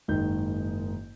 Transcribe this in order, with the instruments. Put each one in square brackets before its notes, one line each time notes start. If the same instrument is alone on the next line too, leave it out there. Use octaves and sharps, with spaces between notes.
[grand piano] F#1 G#2 D#3 G6